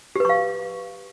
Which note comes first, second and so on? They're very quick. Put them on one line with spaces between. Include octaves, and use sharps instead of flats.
G4 B4 C#6 F5